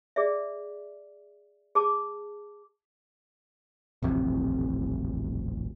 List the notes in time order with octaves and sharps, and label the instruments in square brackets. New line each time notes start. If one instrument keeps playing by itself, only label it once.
[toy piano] G#4 D5 E5
G#4 A5 D6
[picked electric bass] D#1 A1 F2 C3